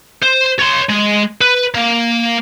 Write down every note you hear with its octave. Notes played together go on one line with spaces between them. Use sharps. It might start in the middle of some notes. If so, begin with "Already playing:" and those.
C5
C#5 C6
G#3
B4
A#3